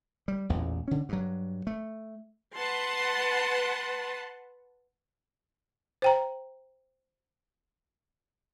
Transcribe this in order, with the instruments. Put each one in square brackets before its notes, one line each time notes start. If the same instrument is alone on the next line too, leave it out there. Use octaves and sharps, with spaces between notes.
[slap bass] G3
A1 E2 A#2
D3 C#4
G2 F#3
A3
[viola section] B4 F#5 A5 C6
[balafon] C5 G5 A#5